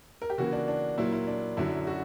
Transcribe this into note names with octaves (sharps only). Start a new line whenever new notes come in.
A#4
G4
C#3 E3 A#3 F#4
D4
D4
A#2 F#3 A#3 E4
E4
D4
F#2 D3 F#3 E4
F#4